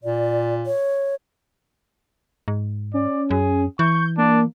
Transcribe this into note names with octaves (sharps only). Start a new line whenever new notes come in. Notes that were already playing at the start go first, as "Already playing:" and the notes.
A#2 D5
C#5
G#2
C#4 D5
F#2 G#4
E3 C#6 G6
A#3 D4